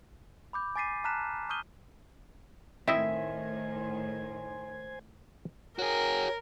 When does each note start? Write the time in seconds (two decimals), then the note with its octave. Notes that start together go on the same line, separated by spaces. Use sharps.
0.53 B5 D6 G6
0.76 G#5 D6 A6 B6 C7 D#7
1.04 A5 A#5 F6 F#6 B6 E7
1.49 C#6 D#6 F6 G6 D#7 G7
2.88 A2 D#3 C4 E4 C5 D#5 E5 G#5
5.79 F#4 G#4 A#4 C#5